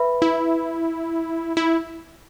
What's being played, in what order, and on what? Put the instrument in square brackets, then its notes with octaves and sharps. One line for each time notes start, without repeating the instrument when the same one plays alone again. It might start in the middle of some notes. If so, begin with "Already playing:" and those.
Already playing: [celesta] B4 E5 B5
[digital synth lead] E4
E4